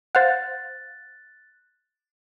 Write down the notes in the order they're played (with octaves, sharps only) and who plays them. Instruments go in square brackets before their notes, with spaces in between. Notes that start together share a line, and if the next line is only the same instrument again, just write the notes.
[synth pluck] C5 F5 F#5 [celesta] F#6 A6